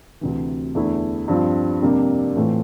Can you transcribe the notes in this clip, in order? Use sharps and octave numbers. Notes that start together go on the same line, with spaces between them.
D2 C3 E3
E2 D3 A3 E4
G2 F3 C4 F4
F2 C3 G3 A#3 D4
A2 E3 A3 C4 F4